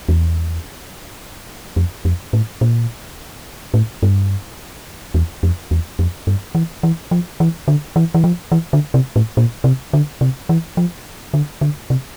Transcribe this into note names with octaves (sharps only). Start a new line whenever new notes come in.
E2
F2
F2
A2
A#2
A2
G2
E2
F2
E2
F2
G2
E3
E3
F3
E3
D3
E3
E3
F3
E3
D3
C3
A2
A#2
C3
D3
C3
E3
F3
D3
D3
C3